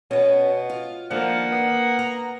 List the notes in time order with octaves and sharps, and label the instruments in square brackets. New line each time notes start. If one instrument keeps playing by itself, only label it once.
[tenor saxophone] B2 [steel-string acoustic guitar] B3 C#4
[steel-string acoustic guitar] F4
[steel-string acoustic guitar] D#3 D4 [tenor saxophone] F3 [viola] A#3 [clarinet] F#5
[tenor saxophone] B3
[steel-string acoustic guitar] A#5